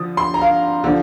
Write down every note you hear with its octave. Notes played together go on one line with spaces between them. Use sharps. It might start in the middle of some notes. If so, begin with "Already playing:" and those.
Already playing: D3 F3 D#6
C6
A#5
F5
D3 F3